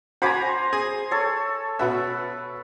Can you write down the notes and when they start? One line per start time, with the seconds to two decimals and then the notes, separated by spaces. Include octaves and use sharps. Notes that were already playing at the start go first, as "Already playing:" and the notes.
0.22 F#4 C5 G#5 A#5 B5 D6
0.73 G#4
1.11 A4 C#5
1.79 B2 F#4 B4 E5